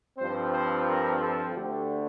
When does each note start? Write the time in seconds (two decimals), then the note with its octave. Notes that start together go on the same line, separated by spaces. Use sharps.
0.18 G2 F3 C4 C5
0.52 C5
0.86 A#4
1.20 A4
1.53 D2 D3 A3 G4